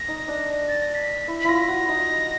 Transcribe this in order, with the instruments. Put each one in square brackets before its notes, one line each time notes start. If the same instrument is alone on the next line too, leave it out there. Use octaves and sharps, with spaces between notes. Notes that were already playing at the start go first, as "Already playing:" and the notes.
Already playing: [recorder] A#6
[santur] D#4
D4
[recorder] A6
A#6
B6
[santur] E4
[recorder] B6
[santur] E4 F4 [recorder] A#6
[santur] F#4
D#4